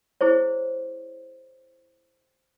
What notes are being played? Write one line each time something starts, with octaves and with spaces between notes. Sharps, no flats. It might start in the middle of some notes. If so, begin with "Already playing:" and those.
E4 G#4 C5 C#5